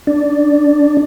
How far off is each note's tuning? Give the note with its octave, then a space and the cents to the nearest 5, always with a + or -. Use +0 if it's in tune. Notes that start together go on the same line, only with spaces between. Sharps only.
D4 +0 D5 +0